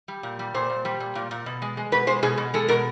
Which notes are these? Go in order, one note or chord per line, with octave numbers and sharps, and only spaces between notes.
G3
A#2
G3
A#2 C5
A#2
G3
A#2
A#2
A#2
B2
G#3
G#3
B2 B4
G#3 C5
B2 G#4
B2
G#3 A4
B2 A#4